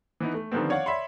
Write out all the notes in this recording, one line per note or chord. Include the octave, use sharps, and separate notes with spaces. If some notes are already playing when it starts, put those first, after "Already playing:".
E3 B3 D#4
A3
D3 D#3 F3 G3 B3 C4
C#5 D5 F5 F#5
C#5 D5 E5 B5 C6